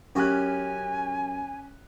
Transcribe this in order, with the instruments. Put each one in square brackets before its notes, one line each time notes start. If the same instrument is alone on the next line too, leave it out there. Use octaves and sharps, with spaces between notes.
[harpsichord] F#2 F#4 F5 [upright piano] C#4 G4 F#6 [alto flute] G#5